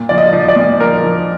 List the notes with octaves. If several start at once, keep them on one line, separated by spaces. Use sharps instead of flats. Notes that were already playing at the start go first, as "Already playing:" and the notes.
Already playing: A#2
F3 D5
D#5
F3
D5
A#2
F3 A#4
F3